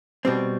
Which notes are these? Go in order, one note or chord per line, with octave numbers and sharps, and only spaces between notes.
B2 G3 C4